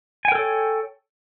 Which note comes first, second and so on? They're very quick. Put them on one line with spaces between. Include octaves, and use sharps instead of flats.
G#5 G5 A#4 A4 C#5